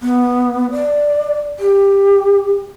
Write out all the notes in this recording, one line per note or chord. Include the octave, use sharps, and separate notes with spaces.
B3
D5
G4